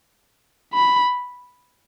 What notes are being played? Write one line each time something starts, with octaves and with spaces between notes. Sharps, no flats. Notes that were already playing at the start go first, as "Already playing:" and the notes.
B5